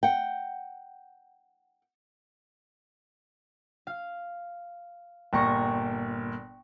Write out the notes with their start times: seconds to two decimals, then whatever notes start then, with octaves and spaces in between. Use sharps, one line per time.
0.03 F#5 G5
3.87 F5
5.33 G1 A#2 G5 A#5 C#6